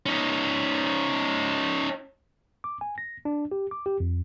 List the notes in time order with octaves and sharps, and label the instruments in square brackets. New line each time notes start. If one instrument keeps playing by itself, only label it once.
[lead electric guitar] C#4 D#4
[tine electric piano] D6
G#5
A#6
D4
G4
D6
G4
F2